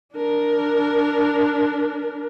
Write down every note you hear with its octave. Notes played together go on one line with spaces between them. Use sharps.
D4 A#4